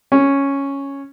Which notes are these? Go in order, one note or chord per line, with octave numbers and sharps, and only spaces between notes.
C#4